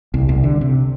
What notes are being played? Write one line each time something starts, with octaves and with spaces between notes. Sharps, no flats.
C2
C2
D3
C3